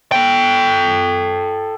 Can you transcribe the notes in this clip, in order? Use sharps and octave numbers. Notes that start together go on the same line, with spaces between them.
A4 G5